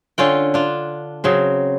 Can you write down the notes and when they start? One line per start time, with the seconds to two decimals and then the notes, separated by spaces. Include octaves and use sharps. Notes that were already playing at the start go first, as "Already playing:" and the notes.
0.18 D3 C#4 F4 G5
0.54 D4 F4
1.24 C#3 F#3 C4